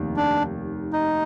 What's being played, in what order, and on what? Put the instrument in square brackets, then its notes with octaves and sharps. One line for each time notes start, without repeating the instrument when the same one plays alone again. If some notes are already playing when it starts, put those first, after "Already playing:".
Already playing: [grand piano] F1 D#2 D#3
[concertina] D4
D#4